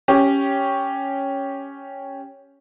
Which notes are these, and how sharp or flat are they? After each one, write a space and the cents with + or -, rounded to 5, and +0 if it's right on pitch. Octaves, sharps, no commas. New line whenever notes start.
C#4 +0 G4 +0